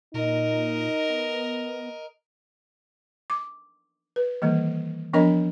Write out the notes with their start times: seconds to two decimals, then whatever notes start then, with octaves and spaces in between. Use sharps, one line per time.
0.14 A#2 D#4 A#4 D#5
1.09 B3
3.30 D6
4.16 B4
4.42 D#3 E3 G3 A#3
5.13 F3 B3 D4 A#4 D#5 B5